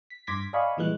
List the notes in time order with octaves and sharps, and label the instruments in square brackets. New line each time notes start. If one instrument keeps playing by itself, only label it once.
[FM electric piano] B6
G2 C6 D6 G#6 A#6 B6
D5 D#5 F5 G#5 B5 C#6
A#2 E3 G3 G#3 F#6